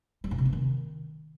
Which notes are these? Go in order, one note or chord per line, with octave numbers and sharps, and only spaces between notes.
G3
G#2
C3
B3
D#3